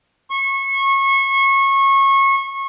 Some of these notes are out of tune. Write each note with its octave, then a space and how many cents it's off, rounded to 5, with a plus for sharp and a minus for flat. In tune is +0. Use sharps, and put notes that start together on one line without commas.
C#6 -25